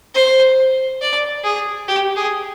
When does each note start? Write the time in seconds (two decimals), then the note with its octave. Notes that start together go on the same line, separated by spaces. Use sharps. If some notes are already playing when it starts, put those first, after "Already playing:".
0.15 C5
1.02 D5
1.44 G#4
1.88 G4
2.17 G#4